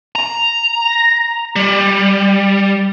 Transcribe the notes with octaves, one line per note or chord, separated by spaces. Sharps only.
A#5
G3